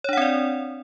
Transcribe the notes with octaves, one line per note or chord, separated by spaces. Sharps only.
C4 D4 C#5 D5 F#5